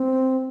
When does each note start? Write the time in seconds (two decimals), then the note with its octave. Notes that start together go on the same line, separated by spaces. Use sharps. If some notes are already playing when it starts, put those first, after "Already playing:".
Already playing: C4